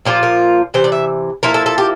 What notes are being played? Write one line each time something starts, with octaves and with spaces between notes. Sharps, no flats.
A#2 F3 A#3 F4 G4
A#4
C3 E3 C5
D5
E5
F3 A#3 E4 A#4
A4
A4
G4